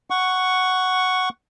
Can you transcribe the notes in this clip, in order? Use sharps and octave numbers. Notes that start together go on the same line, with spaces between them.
F#5 C#6